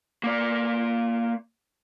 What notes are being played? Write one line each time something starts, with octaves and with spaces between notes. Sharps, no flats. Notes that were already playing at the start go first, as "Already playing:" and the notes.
A#3 D5